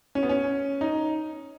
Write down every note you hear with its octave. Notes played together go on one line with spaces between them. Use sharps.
C#4
B3
C#4
D#4